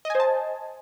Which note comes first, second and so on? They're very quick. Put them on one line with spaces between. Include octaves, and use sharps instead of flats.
D#5 G#5 C5 A5